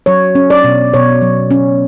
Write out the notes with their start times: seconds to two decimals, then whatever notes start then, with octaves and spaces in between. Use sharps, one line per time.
0.06 F#3 C#5
0.35 C#4
0.50 D5
0.64 B2
0.93 B2 C#5
1.22 F#3
1.51 C#4